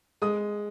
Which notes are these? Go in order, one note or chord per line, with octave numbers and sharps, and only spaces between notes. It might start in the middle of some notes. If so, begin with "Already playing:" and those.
G#3 D#6